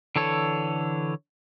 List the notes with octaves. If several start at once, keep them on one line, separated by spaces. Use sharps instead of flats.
D3 E3 A4 C#5